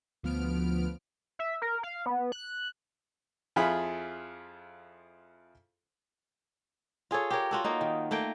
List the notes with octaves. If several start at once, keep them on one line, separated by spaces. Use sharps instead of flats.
D2 F3 B3 F6 D7
E5
A#4
F5
B3
F#6
F2 E4 F4 G#4 B5
F4 G#4 A4 C#5
G4 A#4 C#5
F4 F#4 A4
A#3 D#4
D#3
A3 A#3 G5